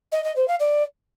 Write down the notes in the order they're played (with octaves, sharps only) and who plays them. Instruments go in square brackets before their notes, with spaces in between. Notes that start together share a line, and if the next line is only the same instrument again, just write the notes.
[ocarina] D#5
D#5
C5
F5
D5